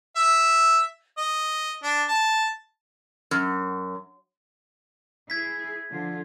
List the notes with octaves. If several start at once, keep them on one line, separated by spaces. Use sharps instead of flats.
E5
D#5
D4
A5
F#2
E4 G#4 G#6 B6
D3 F3 F4